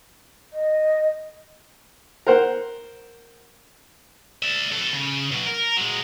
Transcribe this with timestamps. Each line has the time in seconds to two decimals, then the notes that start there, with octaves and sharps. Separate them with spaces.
0.53 D#5
2.27 A#4 C5 F#5
4.43 D5 E5
4.72 B2 A4
4.93 C#3
5.32 B2 F#3
5.46 A#4
5.77 F#3 G#3